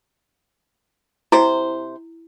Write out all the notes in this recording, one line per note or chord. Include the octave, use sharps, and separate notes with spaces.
C3 E4 C5